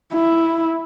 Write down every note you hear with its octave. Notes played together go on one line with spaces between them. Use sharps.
E4